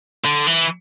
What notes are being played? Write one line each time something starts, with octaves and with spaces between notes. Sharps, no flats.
D3
E3